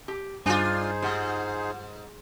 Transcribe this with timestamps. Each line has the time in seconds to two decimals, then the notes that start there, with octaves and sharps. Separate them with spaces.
0.08 G4
0.46 G2 D4 D#4 F4 G#4 C5 G#5
1.02 G#2 F4 G4 F#5